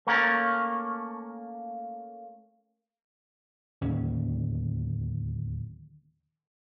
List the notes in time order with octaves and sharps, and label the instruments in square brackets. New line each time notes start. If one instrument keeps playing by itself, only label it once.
[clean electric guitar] A3 A#3 C#4 A#4
[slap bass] D1 D#2 C#4